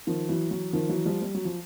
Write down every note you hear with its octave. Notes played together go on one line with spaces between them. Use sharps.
D#3 F3
E3 F#3
E3 F#3
D#3 F3
E3 F#3
F3 G3
G3
F#3
F3